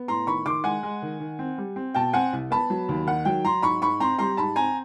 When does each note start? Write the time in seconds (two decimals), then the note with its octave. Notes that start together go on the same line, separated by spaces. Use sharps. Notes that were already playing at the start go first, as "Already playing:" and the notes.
Already playing: B3
0.08 A2 A#5 C6
0.27 D#3 B5 C#6
0.46 D#3 C6 D6
0.64 G#3 F#5 G#5
0.83 G#3
1.02 D#3
1.20 D#3
1.39 C4
1.58 G3
1.76 C4
1.94 B2 G5 A5
2.13 C4 F#5 G#5
2.33 C2
2.51 B3 A5 B5
2.70 F#3
2.89 D#2
3.07 D#3 F#5
3.25 F#3 G5
3.45 F#3 A#5 C6
3.62 G#2 B5 C#6
3.82 G#2 B5 C#6
4.00 C4 A#5 C6
4.18 G3 A#5 C6
4.37 G#2 A5 B5
4.56 C4 G#5 A#5